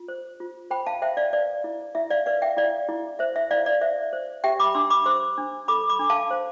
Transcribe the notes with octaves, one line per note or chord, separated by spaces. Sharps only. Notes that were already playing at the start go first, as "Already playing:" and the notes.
Already playing: F4
C5
F4
C5 G5 B5
F5 A5
C5 E5 G5
D5 F5
B4 D5
E4
E4 E5
D5 F5
B4 D5 F5
E5 G5
E4 D5 F5
E4
C5 E5
E5
E4 D5 F5
D5
C5 E5
C5
G4 E5 G5
B5 D6
D4 C6 E6
B5 D6
C5 C6 E6
D4
A4 B5 D6
B5 D6
D4
F5 A5
C5